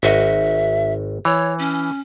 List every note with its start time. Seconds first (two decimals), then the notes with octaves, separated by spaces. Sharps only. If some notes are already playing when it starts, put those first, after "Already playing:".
0.03 G#1 F#4 D#5 E5
1.25 E3 C#5
1.59 C#4